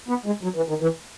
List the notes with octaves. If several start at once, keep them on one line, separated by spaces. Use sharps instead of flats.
B3
G#3
F#3
E3
D#3
E3